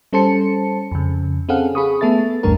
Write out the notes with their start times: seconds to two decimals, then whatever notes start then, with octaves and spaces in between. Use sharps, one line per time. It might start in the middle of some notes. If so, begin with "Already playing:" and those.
0.13 G3 C#4 A4 C5 A5 C#7
0.92 F2 C#3
1.49 C4 C#4 G#4 A4 F5 F#5
1.75 G#4 B5 C#6 D#6
2.01 A3 B3 A4 E5 A6
2.43 A1 E2 G2 A3 D4 A#4